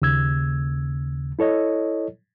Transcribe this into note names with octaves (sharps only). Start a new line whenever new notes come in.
D#2 C#3 E6 G#6
E4 A4 C#5 D#5